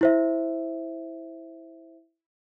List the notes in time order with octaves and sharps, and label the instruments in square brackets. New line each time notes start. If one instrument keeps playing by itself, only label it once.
[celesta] E4 C5 E5